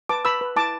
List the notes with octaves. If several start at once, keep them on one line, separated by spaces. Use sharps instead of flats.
B4 A5 D6
B4 B5 E6
B4
E4 A5 D6